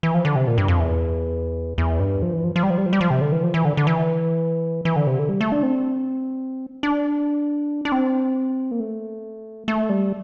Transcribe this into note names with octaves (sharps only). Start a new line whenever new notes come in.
E3
F3
D3
C3
A#2
G2
F2
E2
E2
G2
F3
E3
F3
F3
G3
F3
G3
F3
G3
F3
C3
D3
E3
F3
E3
D3
D3
E3
E3
D3
C3
D3
G3
A3
D4
C4
D4
D4
C4
A#3
A3
A3
G3